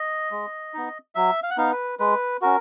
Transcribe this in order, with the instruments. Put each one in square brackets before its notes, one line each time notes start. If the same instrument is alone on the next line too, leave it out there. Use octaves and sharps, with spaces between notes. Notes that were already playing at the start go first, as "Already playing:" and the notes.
Already playing: [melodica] D#5
G#3
B3 D#4
F#3 E5
F5
F#5
B3 D#4 F5
B4
G#3 B4
C#4 F#4 A#4